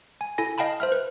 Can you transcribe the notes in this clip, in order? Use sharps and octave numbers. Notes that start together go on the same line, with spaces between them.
G#5
E4 A4 G#5 A#6
D#5 F5 G5 A5 B5
C5 E5 F6
B4